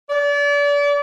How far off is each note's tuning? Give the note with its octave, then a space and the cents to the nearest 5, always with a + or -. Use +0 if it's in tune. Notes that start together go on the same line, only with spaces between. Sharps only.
D5 -35